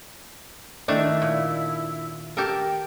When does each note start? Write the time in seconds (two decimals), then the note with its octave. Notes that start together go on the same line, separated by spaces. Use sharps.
0.88 D#3 A3 D4 E4
1.22 A#2
2.37 G4 A4 A#4 G5